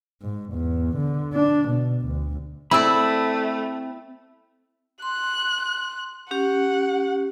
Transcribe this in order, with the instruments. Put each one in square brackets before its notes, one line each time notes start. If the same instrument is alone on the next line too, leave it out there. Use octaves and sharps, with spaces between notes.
[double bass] G#2
E2
D3
D4
B2
D2
[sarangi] A3 [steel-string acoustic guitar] C4 [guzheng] E4 D5 [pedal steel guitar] B5 E6
[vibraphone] C6 [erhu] F#6
[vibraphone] C#4 G4 [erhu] F#5